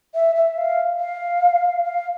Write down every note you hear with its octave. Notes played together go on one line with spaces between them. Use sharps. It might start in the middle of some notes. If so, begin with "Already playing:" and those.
E5
E5
F5
F5
F5